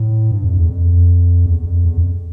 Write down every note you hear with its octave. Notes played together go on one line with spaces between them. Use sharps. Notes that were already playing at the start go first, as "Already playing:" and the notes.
Already playing: A2
G2
F2
E2
F2
E2
E2
F2
E2
F2